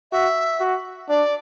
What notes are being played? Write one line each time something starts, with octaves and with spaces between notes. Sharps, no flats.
F#4 E5
F#4
D4 D5